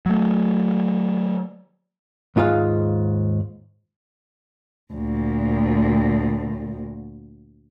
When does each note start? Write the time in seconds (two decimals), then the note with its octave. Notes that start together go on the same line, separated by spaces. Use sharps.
0.06 F#3 A3
2.36 D#2 G#2 F4 G#4 F5
4.94 D2 A#2